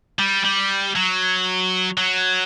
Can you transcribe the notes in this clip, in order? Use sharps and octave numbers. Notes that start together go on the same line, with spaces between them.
G3
G3
F#3
F#3